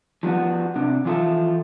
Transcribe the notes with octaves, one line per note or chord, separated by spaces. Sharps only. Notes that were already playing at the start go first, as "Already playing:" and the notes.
F3 G3 B3 F#4
C3 D4
E3 F3 F4 A4 E5